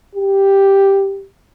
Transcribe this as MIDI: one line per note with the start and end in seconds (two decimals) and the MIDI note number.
0.15 1.26 67